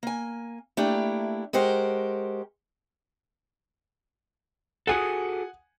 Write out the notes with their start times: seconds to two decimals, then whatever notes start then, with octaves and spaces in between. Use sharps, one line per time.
0.03 A#3 G#5
0.77 A3 A#3 D4 E4 G4
1.53 G#3 F#4 G4 A#4 C5
4.87 F#4 G#4 A4 F#5 G#5 D#6